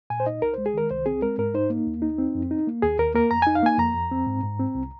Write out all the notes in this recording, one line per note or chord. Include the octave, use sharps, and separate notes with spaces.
A#2 G#5
C5
D#4 D#5
C2 A#4
G#3 C5
G#4
D#3 A#4
C2 C5
C4 G#4
G#3 A#4
G#2 A#4
D#4 C5
A#3
D#2
D#4
C4
F2
D#4
A#3
D#2 G#4
D#2 A#4
A#3 A#4
F2 A#5
D#4 G#5
F5
A#3 G#5
F2 A#5
F2
C4
G#2
G#2
C4
C2